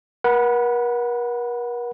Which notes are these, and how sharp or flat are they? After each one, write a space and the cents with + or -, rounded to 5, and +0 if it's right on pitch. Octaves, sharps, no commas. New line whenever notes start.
A#4 +45 F#5 -5 B5 +0